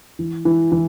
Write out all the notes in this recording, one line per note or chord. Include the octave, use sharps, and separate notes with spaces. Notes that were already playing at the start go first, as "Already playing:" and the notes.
E3
E3
E3